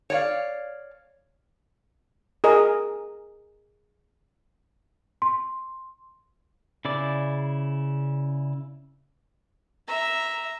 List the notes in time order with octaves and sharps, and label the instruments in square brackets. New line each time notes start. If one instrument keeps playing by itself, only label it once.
[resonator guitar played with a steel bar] C#5 D5 F5
[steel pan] G#4 A#4 D#5
[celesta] C6
[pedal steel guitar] C#3 E4 D5 D6
[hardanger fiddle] E5 A#5